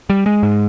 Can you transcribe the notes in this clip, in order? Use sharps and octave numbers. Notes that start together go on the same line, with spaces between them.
G3
G#3
G#2